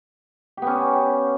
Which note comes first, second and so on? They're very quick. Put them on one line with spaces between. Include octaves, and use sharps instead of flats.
G4 B3 C#4